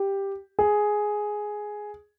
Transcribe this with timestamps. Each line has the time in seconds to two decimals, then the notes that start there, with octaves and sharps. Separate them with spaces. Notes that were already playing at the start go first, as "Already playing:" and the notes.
Already playing: G4
0.59 G#4